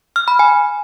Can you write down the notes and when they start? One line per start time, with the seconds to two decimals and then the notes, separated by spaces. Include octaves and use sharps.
0.16 F6
0.28 B5
0.39 G#5